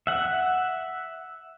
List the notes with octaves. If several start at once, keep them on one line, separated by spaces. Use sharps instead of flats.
E5 F#5